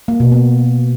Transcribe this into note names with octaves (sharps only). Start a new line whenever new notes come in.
A#3
B2
B3